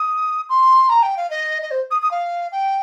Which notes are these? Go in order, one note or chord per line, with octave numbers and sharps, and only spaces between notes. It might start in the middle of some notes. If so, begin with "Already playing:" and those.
Already playing: D#6
C6
A#5
G5
F5
D#5
D#5
C5
D#6
D#6
F5
G5